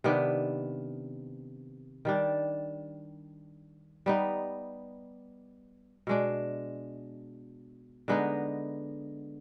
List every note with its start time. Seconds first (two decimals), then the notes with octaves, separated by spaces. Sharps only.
0.04 C3 D#3 B3 D4
2.05 D#3 G3 D4
4.06 G3 B3 D#4
6.07 B2 G#3 D4
8.08 D3 G#3 B3 D#4